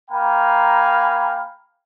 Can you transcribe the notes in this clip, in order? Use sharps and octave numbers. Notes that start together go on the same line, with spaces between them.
A#3 F5 G5 G#5 A#5 B5